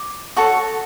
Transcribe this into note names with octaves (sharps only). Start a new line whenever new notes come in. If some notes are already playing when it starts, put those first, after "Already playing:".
Already playing: D6
F#4 A4 C#5 C#6